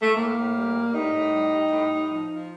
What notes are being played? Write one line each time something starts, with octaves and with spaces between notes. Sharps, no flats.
A3
A2 A#3
A2
G3
G3
A2 D#4
A2
G3
G3
A2
A2
F3
F3